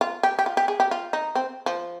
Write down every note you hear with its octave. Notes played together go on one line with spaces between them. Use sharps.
F4
G4
G4
F4
G4
G#4
G4
F4
D#4
C4
F3